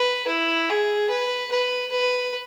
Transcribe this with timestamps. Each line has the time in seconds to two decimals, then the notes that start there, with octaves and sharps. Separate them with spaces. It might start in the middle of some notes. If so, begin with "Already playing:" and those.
Already playing: B4
0.27 E4
0.69 G#4
1.10 B4
1.52 B4
1.91 B4